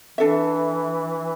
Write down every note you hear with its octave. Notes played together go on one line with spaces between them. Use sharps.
E3 D4 A4 E5